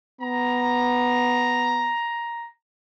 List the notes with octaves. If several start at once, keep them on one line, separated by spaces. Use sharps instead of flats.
B3 A#5